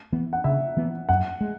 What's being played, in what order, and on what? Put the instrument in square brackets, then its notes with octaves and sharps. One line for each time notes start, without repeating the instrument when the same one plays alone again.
[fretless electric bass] E3 B3
[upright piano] F#5
[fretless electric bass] C#3 [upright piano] E5
[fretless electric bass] E3 B3
[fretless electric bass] F#2 [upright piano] F#5
[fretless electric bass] G#3